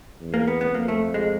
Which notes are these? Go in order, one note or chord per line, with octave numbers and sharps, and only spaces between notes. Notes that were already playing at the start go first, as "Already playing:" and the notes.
E2
A#3
B3
B3
F2 A#3
A3
G#3